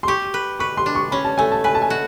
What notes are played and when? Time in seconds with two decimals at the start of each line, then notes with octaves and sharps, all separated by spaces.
0.03 C6
0.08 G4 C#6
0.34 B4
0.59 B4 C#6
0.77 C6
0.86 D4
0.95 C#6
1.11 C#4 B5
1.24 A5
1.38 A3 G#5
1.52 A5
1.64 B4 G#5
1.75 A5
1.82 G#5
1.90 F#4